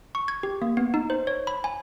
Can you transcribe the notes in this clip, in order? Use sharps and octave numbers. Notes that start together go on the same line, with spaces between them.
C#6
G#6
G4
A#3
B3
D#4
C5
C#5
B5
G#5